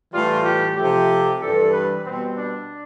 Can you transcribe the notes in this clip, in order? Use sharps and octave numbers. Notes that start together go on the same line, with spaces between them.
A2 E3 G3 F4
G4
C3 F3 A3 G4
G2 E3 G3 A4
B4
B2 G3 C4
D4